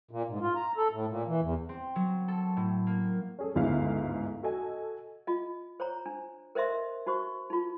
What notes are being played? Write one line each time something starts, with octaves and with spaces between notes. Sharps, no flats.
A#2
G#2
F4
A#5
A4
A2
A#2
E3
E2
C4
F#3
A4
A2
A#3
C#4 G#4 A4
G1 D2 G#2 C#3 E4 F5
F#4 A4 D#5 G#5
F4 D#5
C5 C#5 A#5
D4
A#4 C5 D#5 E5 C6
D#4 F#4 C5 C#6
D#4 F4